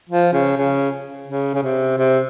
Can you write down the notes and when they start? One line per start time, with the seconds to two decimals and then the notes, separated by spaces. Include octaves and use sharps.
0.09 F3
0.33 C#3
0.57 C#3
1.28 C#3
1.54 C#3
1.63 C3
1.98 C3